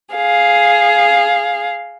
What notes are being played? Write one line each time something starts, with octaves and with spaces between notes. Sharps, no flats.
G#4 F5